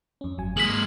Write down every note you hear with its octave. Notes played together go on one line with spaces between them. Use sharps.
F2 C#4
G1 F#3 G#5
G#3 A#3 B6 F#7
G#2